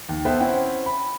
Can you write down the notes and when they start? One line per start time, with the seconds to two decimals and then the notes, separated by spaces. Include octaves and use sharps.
0.09 D#2
0.25 B3 A4 B4 C5 E5 G5
0.40 C4 C#4 E4 F#5 G5
0.86 B5